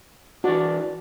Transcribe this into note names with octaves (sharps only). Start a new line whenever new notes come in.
E3 D4 F#4 D5